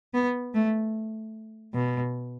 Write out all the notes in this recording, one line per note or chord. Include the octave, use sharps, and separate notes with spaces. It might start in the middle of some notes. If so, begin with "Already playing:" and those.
B3
A3
B2